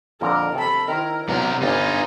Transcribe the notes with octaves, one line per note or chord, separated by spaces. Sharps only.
F2 A#2 D3 A#4
C3 A4 B5
D#3 E4 A#4 C5
B1 C3 A#4 F#5
G1 C3 D#4 F4 B4 C5 G#5